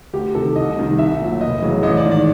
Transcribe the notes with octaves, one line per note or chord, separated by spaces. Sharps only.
D2 G4
C3 D#3 A4
C2 D#5
C3 D#3 G3
C2 E5
A#2 F#3
F1 D#5
E2 C#3 F#3
A1 D#5
D5
G#2 D#3
D5